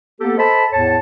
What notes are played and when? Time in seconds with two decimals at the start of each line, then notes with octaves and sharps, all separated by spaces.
0.21 A#3 B3 G4 A4
0.38 A4 C5 D#5 A5 B5
0.73 E2 A2 C#5 A5